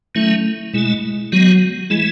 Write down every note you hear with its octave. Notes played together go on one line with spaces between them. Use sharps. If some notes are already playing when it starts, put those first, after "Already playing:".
D#3 F#3 A3 C#4 E4
B2 G#3 A3 E4
D#3 F#3 G#3 B3 F#4
E3 G#3 A3 E4